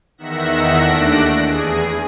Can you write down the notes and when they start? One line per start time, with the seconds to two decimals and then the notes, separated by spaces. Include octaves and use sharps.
0.18 E2 D#3 E5 F#5 A#6
0.80 D#2 A3 D4 F#6 A#6 D7
1.41 E2 G#4